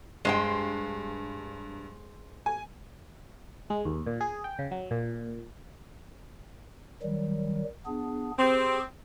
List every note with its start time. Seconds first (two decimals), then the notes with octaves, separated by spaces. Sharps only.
0.25 G2 G#3 C5 G5
2.46 G#5
3.70 G#3
3.85 D#2
4.06 A#2
4.21 G#4
4.44 G5
4.59 C#3
4.71 F#3
4.91 A#2
7.02 D#3 F#3 G3
7.86 B3 D4 G#4
8.39 C4 G4 G#4